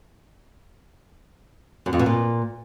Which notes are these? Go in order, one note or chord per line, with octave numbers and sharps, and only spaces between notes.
F#2
F2
B2
A#2